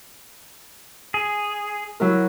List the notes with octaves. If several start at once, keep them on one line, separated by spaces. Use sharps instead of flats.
G#4
F#3 E4 A#4